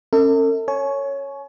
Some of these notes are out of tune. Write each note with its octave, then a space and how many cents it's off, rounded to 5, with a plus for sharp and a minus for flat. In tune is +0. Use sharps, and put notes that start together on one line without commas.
C#4 -25 A4 +45 E5 -40
C#5 +0 G#5 +35